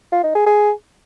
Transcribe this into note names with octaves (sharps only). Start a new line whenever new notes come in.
F4
D#4
G#4
G#4